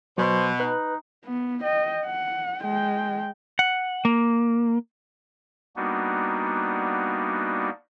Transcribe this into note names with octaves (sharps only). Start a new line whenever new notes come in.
B2 F#3 C5
D#4 B4 F#6
B3
D#5 G5
F#5
G#3 G5
F#5
A#3
G3 A#3 B3 D4 D#4 F#4